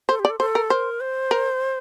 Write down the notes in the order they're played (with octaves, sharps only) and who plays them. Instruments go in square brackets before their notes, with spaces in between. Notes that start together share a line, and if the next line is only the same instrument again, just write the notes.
[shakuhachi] A4 [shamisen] C5
[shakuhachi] G4
[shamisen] D5
[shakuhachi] A4
[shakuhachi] A4 [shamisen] C5
[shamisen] A#4
[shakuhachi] A#4 [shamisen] C5
[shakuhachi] C5
[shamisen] A#4